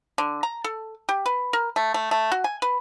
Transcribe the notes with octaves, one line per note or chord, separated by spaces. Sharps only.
D3
A#5
A4
G4
B4
A#4
A3
A3
A3
F#4
G#5
B4